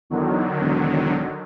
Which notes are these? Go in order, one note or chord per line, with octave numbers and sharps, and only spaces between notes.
E2 D3 D#3 F#3
E1